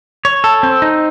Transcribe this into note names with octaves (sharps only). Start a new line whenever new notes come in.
C#5
A4
C4
D#4